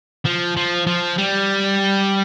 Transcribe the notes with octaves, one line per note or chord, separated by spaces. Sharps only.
F3
F3
F3
G3